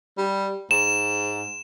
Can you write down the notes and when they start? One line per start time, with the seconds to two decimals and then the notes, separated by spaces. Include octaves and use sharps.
0.18 G3
0.71 G#2 E7